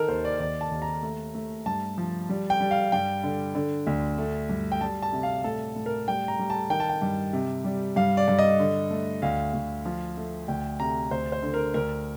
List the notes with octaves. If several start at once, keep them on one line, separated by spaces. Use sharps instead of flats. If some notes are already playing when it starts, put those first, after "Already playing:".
Already playing: D#3 A4 A#4
D#2 C5
D5
D#2 D5
A5
D#2
A#5
A3
A3
G2 A5
F3
G3
G5
G3
F5
G2 G5
D3
D3
D2
A3
G2
G5
G3 A5
A5
C3
F5
A2 A4
A2
A#4
G3 G5
A#5
G3
A5
D#3 G5
A5
G5
G2
C3
G3
G2 F5
D5
G2
D#5
D3
A3
D2 F5
D2
F3
A3
D2 G5
C3 A#5
D2 C5
C5
D3
A#4
D2 A#4